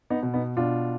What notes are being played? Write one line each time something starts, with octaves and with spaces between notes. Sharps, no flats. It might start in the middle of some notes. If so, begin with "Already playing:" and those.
B3 D#4
B2
B3 D#4
B2 D4 F4